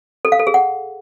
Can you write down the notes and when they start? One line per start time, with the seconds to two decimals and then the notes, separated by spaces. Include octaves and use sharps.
0.25 A4
0.32 F5
0.39 A4
0.47 G#4
0.54 F#5